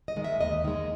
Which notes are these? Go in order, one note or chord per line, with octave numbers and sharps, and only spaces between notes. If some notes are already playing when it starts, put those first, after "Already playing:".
D#5
D#3 G#3
E5
D#2 D#5
D#3 G#3